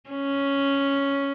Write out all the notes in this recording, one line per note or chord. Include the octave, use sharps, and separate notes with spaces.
C#4